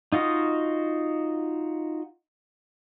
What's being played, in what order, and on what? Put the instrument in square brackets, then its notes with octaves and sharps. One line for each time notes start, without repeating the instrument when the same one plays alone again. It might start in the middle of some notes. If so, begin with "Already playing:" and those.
[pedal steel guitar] D#4 F4 F#4 D#5